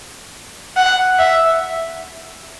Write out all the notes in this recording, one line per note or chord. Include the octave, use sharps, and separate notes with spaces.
F#5
E5